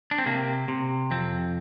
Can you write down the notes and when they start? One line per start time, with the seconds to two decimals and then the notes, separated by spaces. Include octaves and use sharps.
0.11 D4
0.18 C4
0.26 C3 A#3
0.68 C3
1.11 F2 C4